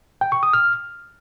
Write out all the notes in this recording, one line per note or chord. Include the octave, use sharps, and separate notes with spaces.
G5
C#6
D#6
F6